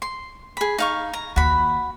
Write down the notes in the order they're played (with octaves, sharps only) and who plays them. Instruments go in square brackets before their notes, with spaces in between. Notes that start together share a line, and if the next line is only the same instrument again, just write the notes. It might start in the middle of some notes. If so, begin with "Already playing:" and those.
[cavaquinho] C6
G#4 B5
D#4 F5 C#6
A#5
[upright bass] D#2 [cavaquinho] F#4 B5